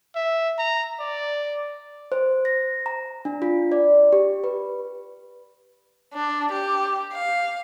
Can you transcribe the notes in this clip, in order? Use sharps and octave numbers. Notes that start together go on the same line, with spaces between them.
E5
A#5
D5
C5
A#6
A#5
D4
F4
D5
G4
B4
D4
G4
F5